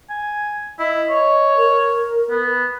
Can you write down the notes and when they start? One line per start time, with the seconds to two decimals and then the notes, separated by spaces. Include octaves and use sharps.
0.10 G#5
0.79 E4 D#5
1.10 C#5
1.57 A#4
2.30 B3